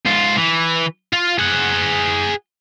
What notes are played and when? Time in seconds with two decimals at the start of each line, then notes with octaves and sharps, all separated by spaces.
0.06 G#2 F4
0.37 E3
1.13 F4
1.39 G#4 F#5